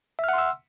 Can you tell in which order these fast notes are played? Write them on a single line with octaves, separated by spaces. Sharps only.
E5 F6 F#5 C6 E6